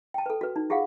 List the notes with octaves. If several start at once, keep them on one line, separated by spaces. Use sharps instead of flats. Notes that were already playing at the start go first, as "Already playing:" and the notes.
G5 A5
A4 B4
F#4 B4
D#4
F4 G4 G#4 F5 F#5